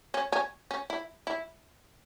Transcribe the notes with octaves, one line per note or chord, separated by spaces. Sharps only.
C#4
C#4
C#4
E4
E4